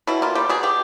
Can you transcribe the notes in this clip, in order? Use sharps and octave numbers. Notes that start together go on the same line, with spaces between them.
B2 E4
A#3 F4
G3 G4
B2 G#4
B2 G4